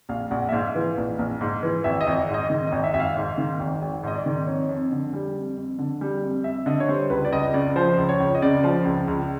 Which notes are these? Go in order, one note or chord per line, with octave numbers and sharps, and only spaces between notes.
A#1 F5
A#1 F#5
E5
G#2 F5
E3
A#1
A#1
G#2
E3
G#1 E5
D#5
G#1
G#2
D#5
D#3
G#1 D#5
E5
G#1 E5
F5
G#2
D#3
G#1
G#1
G#2 D#5
D5
D#3
F2 C#5
F2
D3
G3
F2
F2
D3
G3
F2
F2 E5
D3 D#5
C#5
G3 C5
C#2 B4
D5
C#2 D#5
C#3 D5
F3 C5
C#2
C#5
C#2
D#5
C#3 D5
F3
C#2
C#2